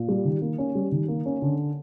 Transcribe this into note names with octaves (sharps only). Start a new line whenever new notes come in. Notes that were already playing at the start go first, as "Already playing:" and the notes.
Already playing: A#2
G3
D#3
A#3
C#4
G3
D#3
A#3
C#4
D3